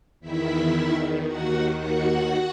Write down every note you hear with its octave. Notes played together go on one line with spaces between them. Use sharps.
E2 D#3 E4 E5
D#2 D#3 F#4 F#5
F#4 F#5